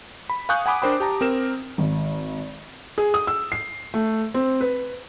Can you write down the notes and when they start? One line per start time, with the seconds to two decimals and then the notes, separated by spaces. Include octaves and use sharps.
0.30 B5
0.49 F5 G#5 C#6 D#6 F#6 G6
0.66 F#5 G#5 B5 D6 D#6
0.82 D4 A#4 C5 G5 B5
1.00 G4 A5 A#5
1.21 C4 A#4 E7
1.78 G#1
2.98 G#4
3.14 D#6
3.27 E6
3.52 C7
3.94 A3
4.34 C4
4.61 B4